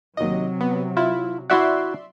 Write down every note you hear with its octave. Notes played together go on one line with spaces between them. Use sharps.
D#2 C3 F#3 D#5
B3
E4 F4
E4 F#4 D5 E5 F#5 C6